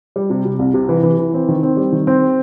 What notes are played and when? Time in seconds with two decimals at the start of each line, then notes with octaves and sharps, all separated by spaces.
0.16 G3
0.30 C3
0.45 C3
0.59 C2
0.74 C3
0.89 E3
1.03 E3
1.19 E3
1.34 C4
1.48 D#3
1.63 C4
1.77 G3
1.92 D#3
2.07 C4